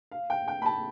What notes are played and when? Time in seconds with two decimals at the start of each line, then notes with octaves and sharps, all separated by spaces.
0.12 F5
0.30 G5
0.48 G5
0.62 B5
0.66 A5